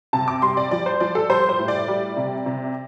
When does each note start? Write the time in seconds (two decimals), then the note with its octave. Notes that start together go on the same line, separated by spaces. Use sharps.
0.13 C3 A5
0.28 D6
0.42 G3 C6
0.57 D5
0.71 F3 D5
0.86 C5
1.00 F3 D5
1.15 A4
1.29 G3 C5
1.49 C5
1.59 A2
1.68 D5
1.88 G3
2.17 C3
2.46 C3